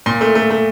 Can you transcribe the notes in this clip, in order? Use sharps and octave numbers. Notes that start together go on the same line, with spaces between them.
A#2 C6
A3
A3
A3